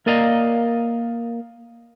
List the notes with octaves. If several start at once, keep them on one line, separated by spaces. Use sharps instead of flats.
A#3 A#4 D5 D#5 F5 A#5